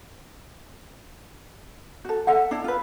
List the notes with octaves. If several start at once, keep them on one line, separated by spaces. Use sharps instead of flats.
F#4 A4
A4 E5 F#5
D4 E4
F4 B4